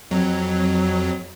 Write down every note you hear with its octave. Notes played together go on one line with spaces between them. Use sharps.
F2 F#3